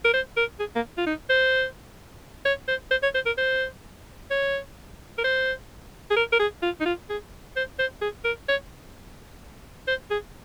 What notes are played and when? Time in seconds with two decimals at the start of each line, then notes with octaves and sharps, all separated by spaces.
0.05 A#4
0.14 C5
0.37 A#4
0.60 G#4
0.75 A#3
0.97 F4
1.06 D#4
1.30 C5
2.46 C#5
2.68 C5
2.91 C5
3.03 C#5
3.15 C5
3.26 A#4
3.38 C5
4.31 C#5
5.18 A#4
5.24 C5
6.11 G#4
6.16 A#4
6.33 A#4
6.39 G#4
6.63 F4
6.81 D#4
6.86 F4
7.10 G#4
7.56 C5
7.79 C5
8.01 G#4
8.25 A#4
8.49 C#5
9.87 C5
10.11 G#4